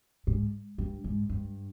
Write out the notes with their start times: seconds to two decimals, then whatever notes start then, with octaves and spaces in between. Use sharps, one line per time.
0.27 G#2
0.78 G2
1.04 G#2
1.30 G2